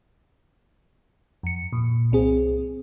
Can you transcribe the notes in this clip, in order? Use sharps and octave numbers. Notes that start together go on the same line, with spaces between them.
F2 C#7
A#2
C2 C4 G#4